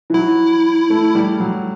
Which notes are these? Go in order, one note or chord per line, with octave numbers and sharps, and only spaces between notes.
E3
F#3 E4
A3
G3
F#3